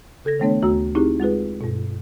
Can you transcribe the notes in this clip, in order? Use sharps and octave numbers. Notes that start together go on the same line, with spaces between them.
C#3 A4 G#6 A#6
D#3 E3 A3 B3 D4 C#5
D2 A3 F#4 A#5 E6
C4 D#4 E4 G4 G#4
G#3 F4 G#4 B4
G2 B2